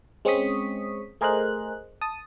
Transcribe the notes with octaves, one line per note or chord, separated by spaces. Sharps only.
G#3 C4 C#4 C#6 D#6 B6
A3 G#4 A#4 C5 D#5 F#6
A5 D#6